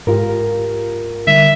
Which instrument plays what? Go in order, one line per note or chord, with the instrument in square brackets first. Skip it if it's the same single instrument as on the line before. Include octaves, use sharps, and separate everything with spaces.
[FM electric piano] G#2 F4 G4 [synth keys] A#4
[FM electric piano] D3 G3 [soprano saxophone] E5